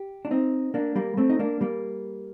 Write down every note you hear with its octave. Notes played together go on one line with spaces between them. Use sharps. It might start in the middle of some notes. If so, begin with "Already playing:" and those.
Already playing: G4
D4
C4 D#4
A#3 D4
G3 A#3
A3 C4
D#4
A#3 D4
G3 A#3